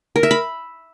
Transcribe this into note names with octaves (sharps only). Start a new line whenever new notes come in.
A#4
E5
B5